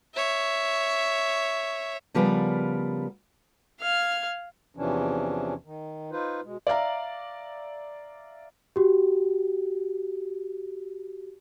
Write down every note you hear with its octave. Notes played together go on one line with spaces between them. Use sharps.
C#5 E5
C#3 F3 G3 B3 A#4 B4
F5 F6 G#6
E2 C3 E3 F3 C#4 D4
D#3
D#4 F4 B4 C5
B2 G#3
D5 E5 F5 A#5
F#4 G4